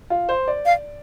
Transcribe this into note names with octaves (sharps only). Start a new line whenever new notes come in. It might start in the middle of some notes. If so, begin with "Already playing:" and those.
F4
C5
D5
F5